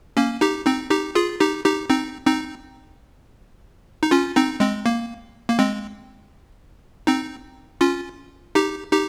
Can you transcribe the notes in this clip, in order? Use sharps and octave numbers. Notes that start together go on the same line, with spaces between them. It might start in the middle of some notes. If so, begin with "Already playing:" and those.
A#3 C#4
D#4 G4
C4 D#4
D#4 G4
F4 G#4
D#4 G4
D#4 G4
C4 D#4
C4 D#4
D#4
C#4 F4
C4 D#4
G#3 C4
A#3
A#3
G#3 C4
C4 D#4
C#4 F4
D#4 G4
D#4 G4